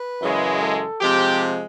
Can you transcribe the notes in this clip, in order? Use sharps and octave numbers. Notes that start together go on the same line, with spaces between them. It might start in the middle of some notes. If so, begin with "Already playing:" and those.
Already playing: B4
F#2 C#3 E3 G#3
A4
C3 F3 G#3 G4